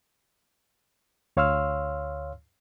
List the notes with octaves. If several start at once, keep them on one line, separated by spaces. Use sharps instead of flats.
D2 C#5 F5 C6 E6 F6